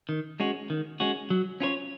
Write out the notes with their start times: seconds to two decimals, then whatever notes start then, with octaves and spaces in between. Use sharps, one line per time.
0.09 D#3
0.40 G#3 C#4 F#4
0.70 D#3
1.00 G#3 C#4 F#4
1.30 F#3
1.60 C#4 F4 A#4 C#5